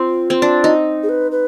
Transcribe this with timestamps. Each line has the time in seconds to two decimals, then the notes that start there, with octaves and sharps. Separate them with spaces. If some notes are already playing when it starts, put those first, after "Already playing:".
Already playing: C4 F4
0.30 C4
0.42 D4
0.64 D#4
1.03 G#4
1.09 B4
1.32 B4